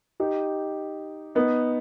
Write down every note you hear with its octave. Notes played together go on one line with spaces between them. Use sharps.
D#4 G4
B3 D#4